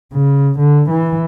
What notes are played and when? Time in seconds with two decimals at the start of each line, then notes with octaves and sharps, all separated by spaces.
0.13 C#3
0.59 D3
0.90 E3